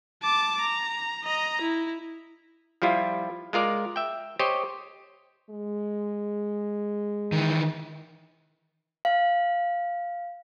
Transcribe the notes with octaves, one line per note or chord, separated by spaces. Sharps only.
A5 D6
A#5
D#5 A#5
E4
F3 G3 E4 F4
G#3 F4 A#4 D5
E5 G5
G4 C5 C#5 D#5
G#3
D#3 E3
F5